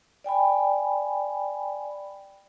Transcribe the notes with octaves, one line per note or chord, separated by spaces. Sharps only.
D5 G5 G#5 B5